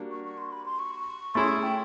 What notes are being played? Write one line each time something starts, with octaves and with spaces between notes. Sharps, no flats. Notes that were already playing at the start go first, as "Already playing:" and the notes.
Already playing: G3 A#3 D4 F#4
C#6
C#6
C6
B5
C6
C#6
A3 C#4 E4 G#4 C6
C#6
G5